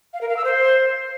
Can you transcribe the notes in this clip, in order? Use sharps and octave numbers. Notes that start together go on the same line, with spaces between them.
F5
A#4
F5
E6
C5